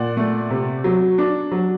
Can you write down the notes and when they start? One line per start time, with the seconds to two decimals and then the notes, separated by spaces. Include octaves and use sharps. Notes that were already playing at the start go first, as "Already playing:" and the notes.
Already playing: A#2 D5 F#5
0.17 A3
0.50 C3
0.84 F#3
1.18 D4
1.52 F#3